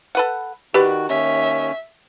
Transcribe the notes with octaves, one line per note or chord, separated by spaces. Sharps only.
A4 B4 F#5
D#3 F#4 G4 B4 D5
D#2 C#4 E5